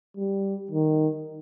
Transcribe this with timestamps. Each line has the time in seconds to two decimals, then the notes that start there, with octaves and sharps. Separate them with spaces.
0.17 G3
0.71 D#3